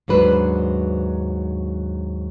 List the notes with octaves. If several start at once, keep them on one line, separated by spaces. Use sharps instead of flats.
D#2 G#2 F#3 D4 B4 C5